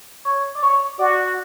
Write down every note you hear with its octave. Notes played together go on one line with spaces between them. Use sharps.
C#5
D5
C#5
F#4 D5